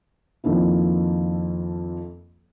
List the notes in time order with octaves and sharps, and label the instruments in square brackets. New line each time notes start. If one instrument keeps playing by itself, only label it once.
[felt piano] F2 D#3 F3 A#3 E4